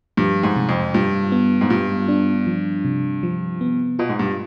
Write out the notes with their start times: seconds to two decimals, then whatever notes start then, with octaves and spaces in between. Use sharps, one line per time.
0.17 G2 F3
0.43 G#2
0.56 C3
0.69 F2
0.94 G2 F4
1.32 B3
1.61 G#2
1.70 G2 F4
2.08 D4
2.47 F3
2.85 C3
3.23 F3
3.61 B3
3.99 B2 F4
4.09 G#2
4.19 G2